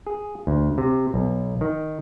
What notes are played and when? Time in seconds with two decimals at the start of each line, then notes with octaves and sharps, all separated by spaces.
0.07 G#4
0.47 D2
0.78 C3
1.14 B1
1.61 D#3